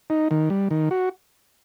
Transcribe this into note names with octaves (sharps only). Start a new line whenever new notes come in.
D#4
D#3
G3
D#3
F#4